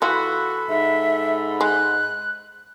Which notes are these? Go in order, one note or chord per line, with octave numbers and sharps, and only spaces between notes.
E3 F4 F#4 A4 B5
G#2 E5
G#3 F#6